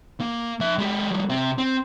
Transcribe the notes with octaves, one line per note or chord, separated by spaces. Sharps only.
A#3
F3 E5
G#3 G4
F3 G3
C3 C4
C4